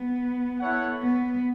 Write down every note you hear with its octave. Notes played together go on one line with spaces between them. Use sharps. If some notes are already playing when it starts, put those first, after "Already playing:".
Already playing: B3
E4 A4 C#5 F#5
B3